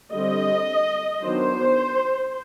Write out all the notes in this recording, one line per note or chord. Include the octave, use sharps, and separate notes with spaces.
D3 G3 C4 D#5
D#3 F#3 B3 D4 C5